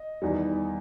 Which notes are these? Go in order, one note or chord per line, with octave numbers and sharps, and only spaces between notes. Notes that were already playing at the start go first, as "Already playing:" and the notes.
Already playing: D#5
E2 D#3 G3